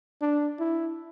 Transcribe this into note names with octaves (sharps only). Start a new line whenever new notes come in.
D4
E4